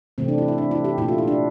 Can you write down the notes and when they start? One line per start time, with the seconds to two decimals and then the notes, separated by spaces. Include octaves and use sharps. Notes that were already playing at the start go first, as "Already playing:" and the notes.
0.18 C3 E3 A3 C4
0.28 D4
0.38 E4
0.48 E4
0.58 D4
0.71 E4
0.84 G4
0.98 A#2 A3 E4
1.08 F4
1.18 E4
1.28 D4